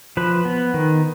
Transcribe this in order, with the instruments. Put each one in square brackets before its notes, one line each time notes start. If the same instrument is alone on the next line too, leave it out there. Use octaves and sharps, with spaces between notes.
[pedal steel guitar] F3 B4
B3
D#3